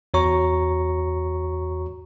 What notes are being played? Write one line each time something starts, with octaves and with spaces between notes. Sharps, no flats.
E2 F#4 C#5 A#5 C#6